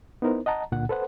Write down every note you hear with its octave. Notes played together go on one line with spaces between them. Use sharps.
B3 D#4 E4 A#4 C5
D#5 F#5 A5 A#5
C#2 A#2 D3 F#5
A4 B4 C5 F#5